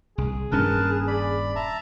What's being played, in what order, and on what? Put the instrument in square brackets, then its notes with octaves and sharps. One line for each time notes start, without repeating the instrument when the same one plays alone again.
[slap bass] C2 [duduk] G#4
[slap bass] D#1 G2 C#4 [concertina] A#4 B4 A5
[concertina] D5 B5
E5 A5 A#5